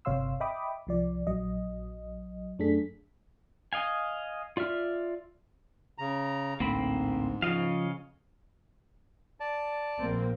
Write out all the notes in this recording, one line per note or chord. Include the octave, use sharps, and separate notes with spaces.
G1 C3 C#5 F5 C6 E6
D#5 E5 G5 B5 D6 D#6
C2 F3 D5
A#1 F#3 D#5
F#2 A3 D4 G#4 A4 B6
D#5 F5 G#5
F4 D5 E5 F6
C#3 A#5
A1 D2 G#2 A#3 C4 B5
C#3 F3 D#5 F5
D5 A5
A#1 A#3 C4